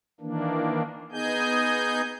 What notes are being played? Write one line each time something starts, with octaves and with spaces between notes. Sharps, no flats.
D#3 E3 A#3 D4
B3 D#4 G#4 D#5 G#5 G6